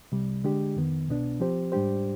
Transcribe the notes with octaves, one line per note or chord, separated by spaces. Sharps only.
C2 C3 G3
D3 G#3 D4 G4
F2 D#3 B3
C2 B2 B3 D4
F3 C4 G4 C5
G#2 G3 D4 G4 C5